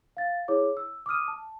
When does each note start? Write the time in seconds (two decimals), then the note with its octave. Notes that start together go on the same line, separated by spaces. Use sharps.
0.17 F5 A6
0.48 E4 G#4 C#5 D6
0.77 E6
1.06 D6 D#6 F6 D#7
1.28 A5